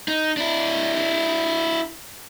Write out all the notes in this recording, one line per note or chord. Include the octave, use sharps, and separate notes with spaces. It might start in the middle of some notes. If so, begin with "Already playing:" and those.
D#4
D4 E4